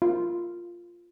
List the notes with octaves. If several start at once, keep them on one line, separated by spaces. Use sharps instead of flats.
F4